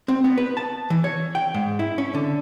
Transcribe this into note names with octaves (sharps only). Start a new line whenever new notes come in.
C4
B3
B4
A5
E3
C#5
G5
G#2
E4
C#4
D3